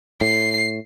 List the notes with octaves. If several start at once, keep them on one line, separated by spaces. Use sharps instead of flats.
A2 C7